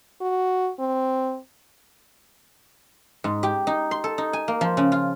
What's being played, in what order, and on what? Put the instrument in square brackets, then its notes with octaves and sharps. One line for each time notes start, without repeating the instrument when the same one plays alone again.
[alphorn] F#4
C4
[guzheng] G#2
G4
D#4
C6
A4
D#4
G#5
A#3
F3
C#3
F4